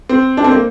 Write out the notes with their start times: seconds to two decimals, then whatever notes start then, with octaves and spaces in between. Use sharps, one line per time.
0.09 C4
0.37 D4
0.44 C4
0.51 A#3